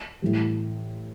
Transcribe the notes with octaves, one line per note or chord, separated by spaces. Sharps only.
A2 E3 G3